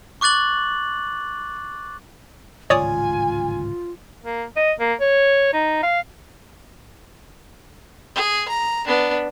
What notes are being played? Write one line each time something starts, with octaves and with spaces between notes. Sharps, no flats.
C#6 D6 F#6 A6 F#7
D1 G#1 C#2 F4 C#5 D5 G#5 D#6
A#3
D#5
A#3
C#5
D#4
F5
G#4
A#5
B3 D4